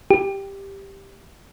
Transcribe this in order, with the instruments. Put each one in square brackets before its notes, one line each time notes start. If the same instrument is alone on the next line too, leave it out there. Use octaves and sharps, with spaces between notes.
[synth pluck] G4